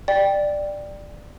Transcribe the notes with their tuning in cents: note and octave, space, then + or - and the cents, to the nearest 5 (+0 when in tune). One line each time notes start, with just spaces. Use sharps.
D5 +10 G5 +0